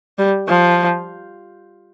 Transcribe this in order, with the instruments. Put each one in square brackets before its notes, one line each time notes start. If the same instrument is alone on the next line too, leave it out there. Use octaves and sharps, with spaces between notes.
[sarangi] G3
F3